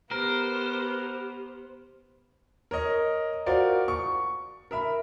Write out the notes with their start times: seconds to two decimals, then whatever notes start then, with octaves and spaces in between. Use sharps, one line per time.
0.11 B3 G4 A#4 C5
2.71 A#4 C#5 D#5
3.46 F4 F#4 A#4 C5 D5
3.88 C#6
4.71 A#4 E5 B5